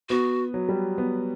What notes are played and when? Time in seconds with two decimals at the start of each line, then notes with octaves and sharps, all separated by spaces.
0.09 B3 F#4
0.54 F#3
0.69 G3
0.98 B3